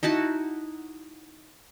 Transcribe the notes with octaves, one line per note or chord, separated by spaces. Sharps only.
D#4 E4 F#4 A5